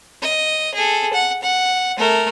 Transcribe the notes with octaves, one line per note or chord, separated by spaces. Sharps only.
D#5
G#4 A4
F#5
F#5
A3 A#4